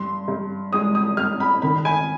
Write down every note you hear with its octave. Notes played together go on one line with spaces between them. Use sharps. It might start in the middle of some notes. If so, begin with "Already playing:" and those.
Already playing: G2 C6
G2
G#3 D#6
D#6
G2 F6
B5
D#3 B5
G#5